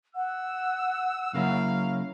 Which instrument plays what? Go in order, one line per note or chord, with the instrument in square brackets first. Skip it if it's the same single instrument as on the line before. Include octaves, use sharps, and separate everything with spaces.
[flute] F#5 [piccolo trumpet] E6
[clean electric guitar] C#3 A#3 E4 [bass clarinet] F#3 [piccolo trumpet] F5